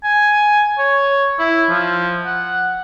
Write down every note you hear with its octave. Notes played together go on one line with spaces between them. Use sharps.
G#5
C#5
E4
F3
F#5